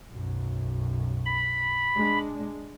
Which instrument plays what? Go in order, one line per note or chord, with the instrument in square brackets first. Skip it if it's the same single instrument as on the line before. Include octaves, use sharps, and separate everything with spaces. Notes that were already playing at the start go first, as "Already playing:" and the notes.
[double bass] B1 F#2
[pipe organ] B5
[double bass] G#3 D4